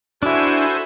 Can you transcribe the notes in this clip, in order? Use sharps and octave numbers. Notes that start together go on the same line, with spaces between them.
D4 E4 F#4 A4 C5 E5 G#5 B5